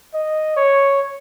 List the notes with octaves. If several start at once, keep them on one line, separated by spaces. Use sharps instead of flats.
D#5
C#5